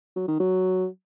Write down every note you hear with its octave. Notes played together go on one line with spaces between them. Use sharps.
F#3
D#3
F#3